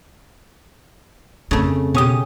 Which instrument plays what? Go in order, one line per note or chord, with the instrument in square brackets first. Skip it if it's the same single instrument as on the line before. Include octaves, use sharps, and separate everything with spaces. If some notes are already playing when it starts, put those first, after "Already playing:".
[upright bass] F2 C4 [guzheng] C#3 A3
[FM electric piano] B2 D#6 [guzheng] C#4 G4